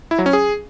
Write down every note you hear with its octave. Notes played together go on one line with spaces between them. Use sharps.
E4
F#3
C#4
G#4